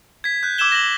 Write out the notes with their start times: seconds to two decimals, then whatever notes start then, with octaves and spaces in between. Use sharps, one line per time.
0.24 G#6 B6
0.43 F#6 G6
0.58 D6 E6 G#6 E7 G7
0.72 A#6 F#7